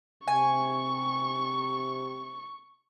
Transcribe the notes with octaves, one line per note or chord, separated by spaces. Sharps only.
C3 G#5 C#6